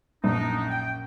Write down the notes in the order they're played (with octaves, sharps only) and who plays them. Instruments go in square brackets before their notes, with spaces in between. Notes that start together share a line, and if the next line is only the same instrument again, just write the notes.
[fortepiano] A#1 F#2 [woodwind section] D4 D#4
[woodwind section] G5